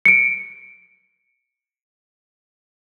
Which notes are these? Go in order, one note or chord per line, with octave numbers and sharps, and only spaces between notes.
C#7 D7